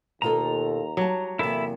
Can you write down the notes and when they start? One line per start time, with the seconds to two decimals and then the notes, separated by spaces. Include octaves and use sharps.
0.22 D#2 B2 F4 A4 A#5
0.97 F#3 G3 A5
1.39 E2 C3 A#3 E4 A4 E5